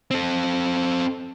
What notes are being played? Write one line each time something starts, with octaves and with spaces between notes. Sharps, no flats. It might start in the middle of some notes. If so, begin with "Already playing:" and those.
C4 A4